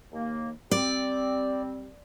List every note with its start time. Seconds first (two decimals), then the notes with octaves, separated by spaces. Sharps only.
0.12 D#2 A#3
0.71 G3 C4 D5